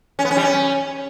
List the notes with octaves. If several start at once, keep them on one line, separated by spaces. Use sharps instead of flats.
C#4
B3
C#4
G3
C#4